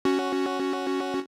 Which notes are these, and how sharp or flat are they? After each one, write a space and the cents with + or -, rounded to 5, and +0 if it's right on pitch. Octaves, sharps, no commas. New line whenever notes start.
C#4 +0 F#4 +5